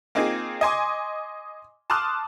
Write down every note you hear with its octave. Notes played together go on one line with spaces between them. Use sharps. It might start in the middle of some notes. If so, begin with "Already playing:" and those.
A#3 C4 D#4 F4 G#4
D#5 G#5 C6 D6
A5 C6 D6 D#6 F6 F#6